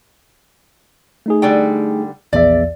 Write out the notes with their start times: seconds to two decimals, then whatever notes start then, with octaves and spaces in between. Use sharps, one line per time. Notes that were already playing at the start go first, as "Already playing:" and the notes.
1.26 A3 D#4 G#4
1.42 D3 G3 G5
2.33 A#1 E2 D5 E5